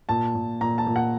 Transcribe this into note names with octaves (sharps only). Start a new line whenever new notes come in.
A#2 A5
A#2
A#2 A#5
A5
A#2
F#5